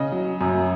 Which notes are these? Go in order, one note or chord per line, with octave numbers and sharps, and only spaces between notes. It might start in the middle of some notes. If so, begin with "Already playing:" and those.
Already playing: C#3 D#5
F#3
F#2